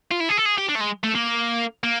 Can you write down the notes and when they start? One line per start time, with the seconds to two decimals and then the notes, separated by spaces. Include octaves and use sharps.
0.11 F4
0.20 E4
0.29 G#4
0.37 A4
0.45 G#4
0.58 G4
0.69 D4
0.75 A3
0.80 G#3
1.03 A3
1.15 A#3
1.84 A#3